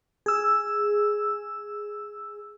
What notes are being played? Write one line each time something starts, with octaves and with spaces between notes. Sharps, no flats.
G#4 E6